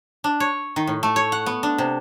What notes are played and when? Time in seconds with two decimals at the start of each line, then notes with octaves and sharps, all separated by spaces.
0.24 D4
0.40 C#5
0.76 D#3
0.87 A2
1.03 A3
1.16 C#5
1.32 F#5
1.46 B3
1.63 D4
1.78 C3